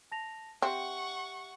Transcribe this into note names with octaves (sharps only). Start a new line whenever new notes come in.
A5 A#6 F7
C4 G4 E5 F#5 C#6